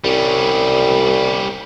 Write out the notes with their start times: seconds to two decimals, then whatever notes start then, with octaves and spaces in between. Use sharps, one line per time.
0.04 C2 G3 C#4